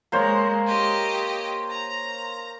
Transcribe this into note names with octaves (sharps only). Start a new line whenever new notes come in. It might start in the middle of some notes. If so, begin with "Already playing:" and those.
G#3 A#3 C5 C#5
G4 D#5
A#5